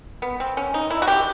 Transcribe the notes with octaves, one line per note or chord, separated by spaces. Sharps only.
B3
C4
C#4
D#4
E4
F#4
G4